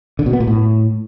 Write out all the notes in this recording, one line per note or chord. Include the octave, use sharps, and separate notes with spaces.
D3
B2
B3
A#2
A2